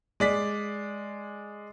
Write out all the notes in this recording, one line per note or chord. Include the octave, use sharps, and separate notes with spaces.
G#3 D5 B6